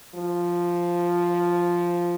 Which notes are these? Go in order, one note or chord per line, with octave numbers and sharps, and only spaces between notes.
F3